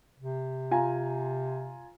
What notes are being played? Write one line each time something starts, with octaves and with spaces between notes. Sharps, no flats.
C3
F4 G#5 A#5